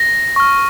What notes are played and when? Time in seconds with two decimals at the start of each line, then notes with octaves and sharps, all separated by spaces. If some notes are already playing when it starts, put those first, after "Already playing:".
Already playing: A#6
0.36 C#6 F6